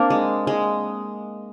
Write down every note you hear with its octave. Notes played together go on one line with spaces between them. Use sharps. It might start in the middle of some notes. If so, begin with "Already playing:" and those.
Already playing: A#3 C4 D4
G#3
G#3